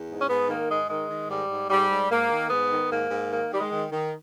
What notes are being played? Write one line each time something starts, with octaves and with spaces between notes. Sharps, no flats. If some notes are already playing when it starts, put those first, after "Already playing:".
Already playing: E2
G#2
C#4
G#2 B3
D#3 A#3
G#2 G#3
D#3 G#3
D#3
G#2 G3
G#2
G#2 G3
G#2
G#2 A#3
D#3
G#2 B3
D#3
G#2 A#3
G#2
D#3 A#3
D#3 G3
G#3
D#3
D#3